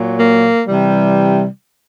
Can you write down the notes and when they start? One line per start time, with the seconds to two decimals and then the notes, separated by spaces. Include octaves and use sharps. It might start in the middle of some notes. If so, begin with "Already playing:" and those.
Already playing: A#2 F#3
0.19 A#3
0.67 C3 E3 G3